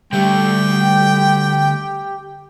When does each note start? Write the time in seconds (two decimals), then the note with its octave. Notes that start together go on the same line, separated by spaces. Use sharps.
0.13 D3 G3 A3 G4 G5